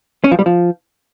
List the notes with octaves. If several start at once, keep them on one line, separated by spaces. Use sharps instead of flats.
C#4
F3
G3
F3